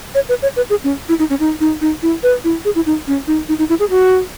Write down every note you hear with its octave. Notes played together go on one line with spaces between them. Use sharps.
C#5
B4
C#5
B4
G#4
C#4
E4
D#4
C#4
D#4
D#4
D#4
E4
B4
E4
G#4
E4
D#4
C#4
D#4
D#4
D#4
E4
G#4
F#4